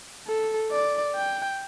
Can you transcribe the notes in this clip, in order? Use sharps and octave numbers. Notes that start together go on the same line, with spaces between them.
A4
D5
G5